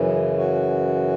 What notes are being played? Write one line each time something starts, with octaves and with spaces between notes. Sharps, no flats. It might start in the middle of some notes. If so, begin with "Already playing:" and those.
Already playing: F#2 C#3 E3
F#4